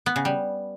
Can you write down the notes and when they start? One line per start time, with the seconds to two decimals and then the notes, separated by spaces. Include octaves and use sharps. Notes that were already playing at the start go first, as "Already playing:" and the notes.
0.06 B3
0.16 C#3
0.25 G3